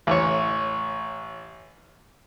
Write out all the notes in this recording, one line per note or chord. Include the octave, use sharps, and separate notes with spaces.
A1 C#5